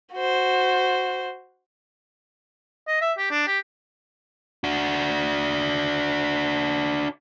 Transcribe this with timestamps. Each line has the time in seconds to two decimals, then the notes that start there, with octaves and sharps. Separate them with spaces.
0.14 F#4 C5
2.88 D#5
3.02 E5
3.18 G4
3.31 D4
3.48 G4
4.64 D4 F#4